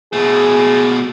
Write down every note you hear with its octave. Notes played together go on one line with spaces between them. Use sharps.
B2 A3 G#4